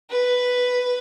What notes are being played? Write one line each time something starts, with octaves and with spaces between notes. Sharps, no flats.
B4